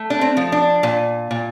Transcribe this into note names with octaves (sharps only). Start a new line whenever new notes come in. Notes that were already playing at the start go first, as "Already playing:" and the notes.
Already playing: A3
D4
C4
F3
D4
A#2
A#2